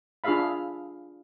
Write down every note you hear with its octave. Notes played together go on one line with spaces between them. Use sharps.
D4 F4 G#4 E5 F5 B5